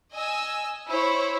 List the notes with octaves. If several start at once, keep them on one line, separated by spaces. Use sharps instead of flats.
D#5 G#5 E6
E4 C5 C#5